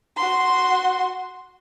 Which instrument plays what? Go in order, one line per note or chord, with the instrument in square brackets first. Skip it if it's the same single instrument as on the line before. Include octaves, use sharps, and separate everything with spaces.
[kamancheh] F#4 C6